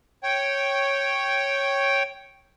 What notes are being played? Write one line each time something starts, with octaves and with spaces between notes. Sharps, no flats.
C#5 G5